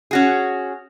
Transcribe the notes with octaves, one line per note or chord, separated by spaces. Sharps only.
C#4 F#4 G#4